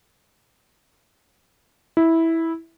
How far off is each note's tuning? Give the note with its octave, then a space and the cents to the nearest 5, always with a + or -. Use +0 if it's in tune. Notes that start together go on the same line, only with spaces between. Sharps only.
E4 -10